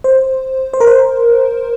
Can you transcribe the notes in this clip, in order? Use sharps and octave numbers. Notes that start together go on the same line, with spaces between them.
C5
C5
A#4
C5